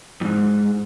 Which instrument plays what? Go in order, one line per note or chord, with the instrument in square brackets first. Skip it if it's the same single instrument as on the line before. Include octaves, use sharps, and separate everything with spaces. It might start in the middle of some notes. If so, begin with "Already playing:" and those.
[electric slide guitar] F2 G#2